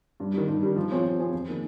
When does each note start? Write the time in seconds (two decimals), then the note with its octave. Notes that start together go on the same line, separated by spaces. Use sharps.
0.20 G2
0.34 D#3 G3
0.48 G2
0.62 D#3 G3
0.76 F3
0.91 C4 F4 G#4 C#5
1.04 F3
1.18 C4 F4 G#4 C#5
1.33 F2
1.48 D#3 A#3